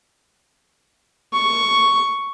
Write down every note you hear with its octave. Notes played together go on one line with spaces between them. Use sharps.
C#6